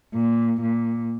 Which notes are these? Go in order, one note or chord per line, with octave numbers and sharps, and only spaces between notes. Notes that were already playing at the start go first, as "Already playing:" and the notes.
A#2
A#2